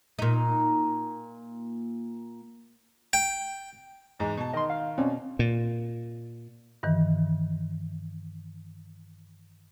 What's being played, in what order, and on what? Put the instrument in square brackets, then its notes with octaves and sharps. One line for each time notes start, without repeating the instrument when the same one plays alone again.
[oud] A#2 D#4
[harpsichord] G5
[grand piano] E2 G#2 G#3
B2 A5
[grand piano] D#3 [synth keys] D#5 C6
[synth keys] F5
[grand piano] B2 [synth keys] C4 C#4 D5
[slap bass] A#2
[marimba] G2 D#3 E3